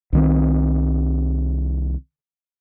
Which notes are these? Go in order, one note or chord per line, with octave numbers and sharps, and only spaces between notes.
C2 D#3 C4